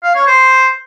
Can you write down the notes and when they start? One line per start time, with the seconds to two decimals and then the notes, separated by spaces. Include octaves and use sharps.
0.03 F5
0.15 C#5
0.27 C5